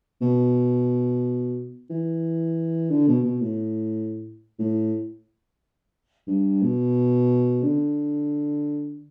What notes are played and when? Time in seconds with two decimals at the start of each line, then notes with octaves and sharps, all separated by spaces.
0.21 B2
1.90 E3
2.90 D3
3.08 B2
3.24 B2
3.41 A2
4.59 A2
6.27 G2
6.62 B2
7.63 D3